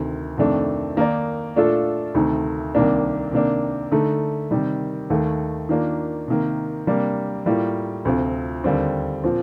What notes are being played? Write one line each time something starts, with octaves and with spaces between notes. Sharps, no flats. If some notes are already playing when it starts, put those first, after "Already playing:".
Already playing: D2 C3 D#3
F2 C3 D#3 A3 D4
D#3 A#3 D#4 A#4 D5
A#2 A3 D4 F4 A4
D2 C3 D#3 A3 D#4
C2 C3 D#3 A#3 D4
C3 D#3 A#3 D4
D3 A3 D#4
C3 D#3 G3
D#2 D#3 A3
D#3 A#3 D4 F4
C3 D#3 A#3
C3 G3 A#3 D4
A2 G3 A#3 F4
D2 C3 F3 C4 F4
D#2 D3 G3 C4
A#2 F3 C4